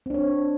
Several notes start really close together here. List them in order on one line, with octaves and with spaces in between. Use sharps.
C4 D4 C#5